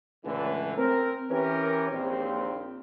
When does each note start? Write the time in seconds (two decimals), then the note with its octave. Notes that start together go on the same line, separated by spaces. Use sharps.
0.25 C#2 A2 D3 E3
0.77 C4 A#4
1.31 E3 C#4 G4 A#4
1.91 A#1 D#2 C4